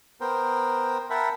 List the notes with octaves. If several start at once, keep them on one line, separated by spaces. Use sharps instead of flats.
B3 A#4 C5 G5
A#4 E5 F#5 G5 A5 B5